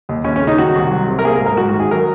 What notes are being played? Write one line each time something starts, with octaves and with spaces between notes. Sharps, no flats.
D#2
D#2 C#4
C#4
C#3
D#4
D#3 F#4
C2
F#3
C3
A#4
A#3 G#4
A#4
G#2
A#4
G#2 F#4
F#4
D#3
G#4
F#3 A#4